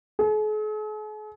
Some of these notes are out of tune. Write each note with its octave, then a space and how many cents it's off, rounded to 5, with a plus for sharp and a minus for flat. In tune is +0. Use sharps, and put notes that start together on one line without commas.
G#4 +45